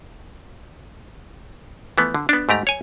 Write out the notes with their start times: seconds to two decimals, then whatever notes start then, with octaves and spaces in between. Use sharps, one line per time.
1.98 E3 F3 A3 B3
2.14 D3
2.29 B3 D4
2.49 G#2 A3 G4 A#5
2.67 C#5 G#5